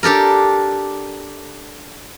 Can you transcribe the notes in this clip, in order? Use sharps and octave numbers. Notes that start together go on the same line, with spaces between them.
D4 G4 A4 A#4